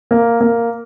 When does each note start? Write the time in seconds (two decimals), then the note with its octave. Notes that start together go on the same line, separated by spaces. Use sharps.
0.11 A#3
0.41 A#3